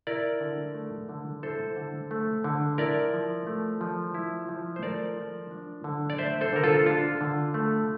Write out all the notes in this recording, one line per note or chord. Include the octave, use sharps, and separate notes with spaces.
E4 A#4 D5
D3
A3
D3
E4 A4 C5
D3
A3
D3
E4 A#4 D5
F3
A3
F3
E4
F3
C5
A3 A#4 D5
F3
D4
D3
D5
A3 C5 E5
A4 C5
D3 A#4
F4 A4
D4 F4
D3
A3